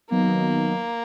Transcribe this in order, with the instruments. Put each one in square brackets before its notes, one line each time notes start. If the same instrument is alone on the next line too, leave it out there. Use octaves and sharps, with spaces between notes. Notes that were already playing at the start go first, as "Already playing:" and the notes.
[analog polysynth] D#3 F#3 B3 D#4 [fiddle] A#3